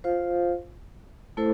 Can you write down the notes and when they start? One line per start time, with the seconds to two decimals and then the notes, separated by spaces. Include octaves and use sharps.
0.04 F4 C5 F5
1.37 A3 E4 A4 C5